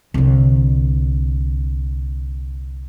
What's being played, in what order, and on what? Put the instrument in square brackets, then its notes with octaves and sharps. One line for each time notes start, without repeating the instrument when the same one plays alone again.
[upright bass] C2 D3